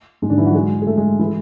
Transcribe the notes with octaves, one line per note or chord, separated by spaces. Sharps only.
G#2 G#3
D3 D4
E3 E4
F#3 F#4
G#3 G#4
G#4
A3 A4
G#3 G#4
E3 E4